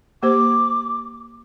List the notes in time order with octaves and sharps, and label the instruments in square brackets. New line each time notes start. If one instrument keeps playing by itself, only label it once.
[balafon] A#3 G4 C5 [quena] D6